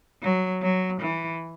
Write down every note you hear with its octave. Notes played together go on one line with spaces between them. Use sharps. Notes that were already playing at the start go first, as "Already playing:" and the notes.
F#3
F#3
E3